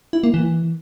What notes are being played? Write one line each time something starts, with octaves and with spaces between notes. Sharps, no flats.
E4
A#3
E3